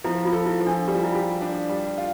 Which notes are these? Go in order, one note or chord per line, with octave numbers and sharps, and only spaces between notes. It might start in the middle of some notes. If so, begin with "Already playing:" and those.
F3 E4
F4
A4
E4
F3
D4
G3 G4
F4
E4
F4 G4
D4
G3
F4